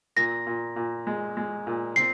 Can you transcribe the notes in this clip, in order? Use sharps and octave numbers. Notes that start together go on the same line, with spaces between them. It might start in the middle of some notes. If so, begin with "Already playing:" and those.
A#2 A#6
A#2
A#2
G#3
G#3
A#2
C4 C7